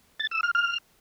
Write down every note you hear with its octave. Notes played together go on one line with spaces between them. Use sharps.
A6
E6
F6
F6